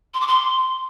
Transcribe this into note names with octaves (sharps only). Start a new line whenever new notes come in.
C6
D6
C6